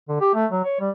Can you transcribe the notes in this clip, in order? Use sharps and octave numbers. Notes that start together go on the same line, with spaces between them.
D3
G4
A3
F#3
C#5
G3